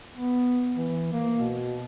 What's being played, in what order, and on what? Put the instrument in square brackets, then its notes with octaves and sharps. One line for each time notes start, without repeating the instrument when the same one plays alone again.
[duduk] B3
E3
A#3
B2